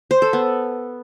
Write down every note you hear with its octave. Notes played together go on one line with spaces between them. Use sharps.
C5
A4
B3